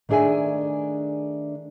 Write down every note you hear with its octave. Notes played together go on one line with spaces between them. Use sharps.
D#3 A3 D4 G#4 E5 G#5